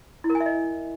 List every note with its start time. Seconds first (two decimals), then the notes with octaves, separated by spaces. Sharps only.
0.24 E4
0.30 A#4
0.35 G#5
0.40 E5
0.46 D#5